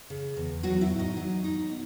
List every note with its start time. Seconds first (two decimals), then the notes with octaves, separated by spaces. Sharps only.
0.10 C#3
0.37 E2
0.63 F#3 F#4 F#5
0.81 E4 E5
0.90 A2
0.99 D#4 D#5
1.17 F#3
1.44 D#4
1.70 B2